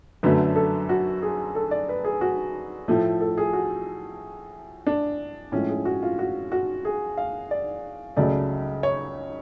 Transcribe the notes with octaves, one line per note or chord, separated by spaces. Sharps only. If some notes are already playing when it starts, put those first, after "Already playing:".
F#2 D3 F#3 A3 B4
A4
F#4
G#4
A4
D5
B4
G#4
F#4
A2 F3 A3
A4
G#4
F#4
D4
A2 F3 G#3 C#4
G#4
F#4
F4
F#4
F#4
G#4
F5
D5
C#2 C#3 F#3 A3 D5
C#5